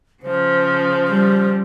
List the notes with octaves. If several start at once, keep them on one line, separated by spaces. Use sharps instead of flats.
C#3 F3 C5
G3